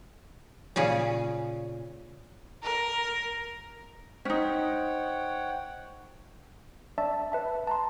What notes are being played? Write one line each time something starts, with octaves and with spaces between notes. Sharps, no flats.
A#2 C#3 C#4 G#4
A#4
C#4 D#4 C5 C#5 F#5 G5
D4 D5 E5 A5 C#6 E6
B4 E5 A5
A5 A#5 C6